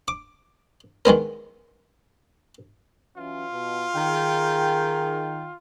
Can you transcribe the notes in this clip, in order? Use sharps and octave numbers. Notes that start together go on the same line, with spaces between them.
D6
D#3 G#3 B3 A#4
E3 F#3 C#4 F4
B2
D#3 G#4 G5